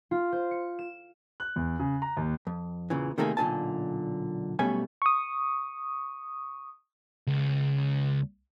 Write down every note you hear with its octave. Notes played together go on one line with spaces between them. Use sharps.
F4
C5
C#7
E7
F#6
E2
C#3
A#5
D#2
F2
E2 A#2 C#3 E3
C3 D#3 A3 A#3 D#4 G#4
B1 A#2 D3 E4 G#5 A5
B1 B2 G3 A3 C#4 G#5
C#6 D#6
C#2